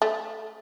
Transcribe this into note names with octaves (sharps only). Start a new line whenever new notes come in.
A3